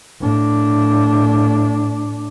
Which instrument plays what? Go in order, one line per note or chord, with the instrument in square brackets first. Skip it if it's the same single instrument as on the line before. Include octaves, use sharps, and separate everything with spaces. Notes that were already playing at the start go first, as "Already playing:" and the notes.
[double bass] A2 D4